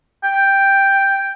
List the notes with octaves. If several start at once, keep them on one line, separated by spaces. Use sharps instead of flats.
G5